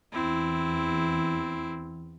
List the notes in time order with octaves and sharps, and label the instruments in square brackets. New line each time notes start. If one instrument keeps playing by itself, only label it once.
[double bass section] E2 [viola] C4 E4